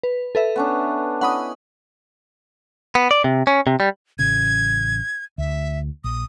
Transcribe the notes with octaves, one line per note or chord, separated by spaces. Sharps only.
B4
A4 B4 E5
B3 C#4 D4
C#4 E4 D#5 F#5 B5 D#6
B3
D5
C3
C#4
C3
G3
A1 C#3 G#6
D2 E5
A#1 D#6